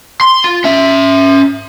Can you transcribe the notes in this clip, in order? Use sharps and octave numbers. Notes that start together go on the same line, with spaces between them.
C6
F4
C#4 E5